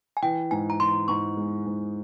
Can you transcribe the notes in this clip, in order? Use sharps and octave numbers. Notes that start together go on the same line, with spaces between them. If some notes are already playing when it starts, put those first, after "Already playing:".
G#5
E3 G5
G#2 G#5
A#5
E3 C6
G#2 C#6
G#3
G#2